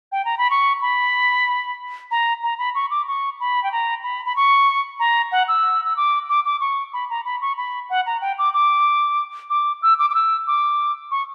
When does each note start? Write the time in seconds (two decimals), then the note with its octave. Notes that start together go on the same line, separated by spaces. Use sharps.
0.12 G5
0.25 A#5
0.38 B5
0.50 C#6
0.82 B5
2.11 A#5
2.43 A#5
2.58 B5
2.75 C#6
2.91 D6
3.07 C#6
3.40 B5
3.63 G5
3.72 A#5
4.03 B5
4.26 B5
4.36 C#6
5.00 A#5
5.32 F#5
5.48 E6
5.85 E6
5.96 D6
6.29 D6
6.45 D6
6.60 C#6
6.93 B5
7.10 A#5
7.25 B5
7.41 C#6
7.57 B5
7.90 F#5
8.06 A#5
8.21 G5
8.38 D6
8.53 D6
9.50 D6
9.82 E6
9.99 D6
10.10 D6
10.14 E6
10.47 D6
11.11 C#6